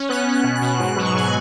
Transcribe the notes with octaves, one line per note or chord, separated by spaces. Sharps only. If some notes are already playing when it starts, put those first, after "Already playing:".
Already playing: C#4
B3 F#6
B3
F#6
B2
F#6
B2
G#2 F#6
F#3
C#6
G#2 G#5